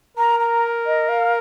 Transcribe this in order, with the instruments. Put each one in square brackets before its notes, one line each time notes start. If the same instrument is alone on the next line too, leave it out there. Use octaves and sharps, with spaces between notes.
[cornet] A#4 [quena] A#5
[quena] A#5
D#5
F5